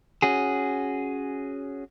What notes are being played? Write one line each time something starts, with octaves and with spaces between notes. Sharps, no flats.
C#4 F#4 G#4